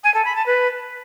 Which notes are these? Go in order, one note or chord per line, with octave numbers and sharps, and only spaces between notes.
G#5
A4
B5
A5
B4